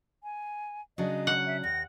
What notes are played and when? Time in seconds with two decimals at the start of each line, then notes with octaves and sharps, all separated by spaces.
0.23 G#5
0.98 C#3 F#3 D4 D#5
1.27 F#5
1.46 E5
1.64 D#2 A#6